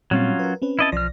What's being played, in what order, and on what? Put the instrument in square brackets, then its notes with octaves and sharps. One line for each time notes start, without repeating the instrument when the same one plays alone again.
[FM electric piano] A#2 G3 C4 [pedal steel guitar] F#3 C#4 F4
[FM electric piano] A#4 B4
C4 C#4 B4
[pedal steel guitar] E4 D#5 A5
[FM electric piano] B1 D5 A#6 [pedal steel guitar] F3 F6